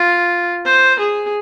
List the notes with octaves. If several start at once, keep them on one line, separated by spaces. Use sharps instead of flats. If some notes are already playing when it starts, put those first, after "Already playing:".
Already playing: F4
C5
G#4